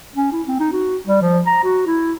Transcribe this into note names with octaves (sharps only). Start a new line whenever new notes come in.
C#4
E4
C4
D#4
F#4
G3
F3
A#5
F#4
E4